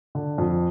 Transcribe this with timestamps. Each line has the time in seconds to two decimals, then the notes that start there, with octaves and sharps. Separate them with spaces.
0.15 D3
0.38 F2